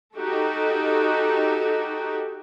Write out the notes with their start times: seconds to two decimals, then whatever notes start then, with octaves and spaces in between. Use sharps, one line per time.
0.17 D#4 F#4 G4 A4